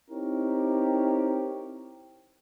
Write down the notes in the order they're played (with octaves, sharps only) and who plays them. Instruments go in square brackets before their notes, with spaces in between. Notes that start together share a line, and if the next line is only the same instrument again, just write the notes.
[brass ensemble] C4 D#4 E4 G4 A#4 C#5